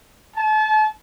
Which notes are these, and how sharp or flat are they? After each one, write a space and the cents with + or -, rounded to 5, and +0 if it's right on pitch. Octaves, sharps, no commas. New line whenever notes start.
A5 -35